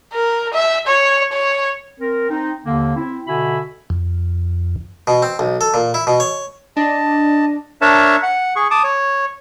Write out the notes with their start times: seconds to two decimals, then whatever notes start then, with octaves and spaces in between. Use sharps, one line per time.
0.13 A#4
0.53 E5
0.87 C#5
1.33 C#5
2.00 C4 A#4
2.30 C4 D#4
2.66 D#2 D3 A#3
2.96 C4 E4
3.27 B2 D3 F#4 E5 G#5 B5
3.90 F2
5.07 B2
5.22 C4
5.39 B1
5.61 A4
5.74 A#2
5.94 E4
6.07 B2
6.20 C#5
6.77 D4 D#5 A5
7.81 D4 A#4 C#5 E5 A5
8.23 F#5
8.56 G#4 C#6
8.71 A5 D6 D#6
8.84 C#5